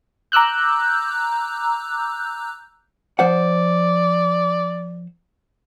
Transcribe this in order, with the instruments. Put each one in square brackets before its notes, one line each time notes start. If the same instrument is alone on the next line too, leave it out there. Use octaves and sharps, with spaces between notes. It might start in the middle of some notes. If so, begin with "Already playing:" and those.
[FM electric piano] A#5 D6 E6 F#6 G6
[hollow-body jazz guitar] F3 C5 F#5 [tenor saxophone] D5